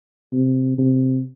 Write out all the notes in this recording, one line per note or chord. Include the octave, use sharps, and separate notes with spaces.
C3
C3